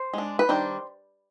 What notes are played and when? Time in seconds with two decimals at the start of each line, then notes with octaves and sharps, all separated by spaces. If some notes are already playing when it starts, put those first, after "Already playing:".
Already playing: C5
0.14 G#3 D4
0.39 B4
0.49 D#3 G3 D4 C5